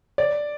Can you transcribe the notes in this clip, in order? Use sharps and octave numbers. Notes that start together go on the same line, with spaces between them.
D5